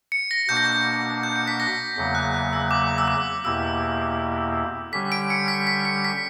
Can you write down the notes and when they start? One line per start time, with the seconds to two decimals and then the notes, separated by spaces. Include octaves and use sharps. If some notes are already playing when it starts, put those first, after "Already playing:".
0.12 C#7
0.31 A#6
0.48 B2 A#3 D4 F#4 G6
0.57 A#6
0.65 G6
1.23 G6
1.36 C#7
1.48 B6
1.60 A#6
1.96 E2 C#3 F#3 A#3 A#6
2.15 F#6
2.34 F#6
2.53 E6
2.71 D6
2.98 E6
3.08 D6
3.45 E2 B2 A#3 E4 G4 E6
4.93 D3 G3 C#4 G4 B6
5.12 D7
5.30 C#7
5.48 B6
5.67 B6
5.85 C#7
6.05 B6